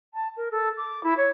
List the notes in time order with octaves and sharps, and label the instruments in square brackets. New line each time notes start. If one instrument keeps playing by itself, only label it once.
[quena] A5
A#4
A4
D6
E4
C#5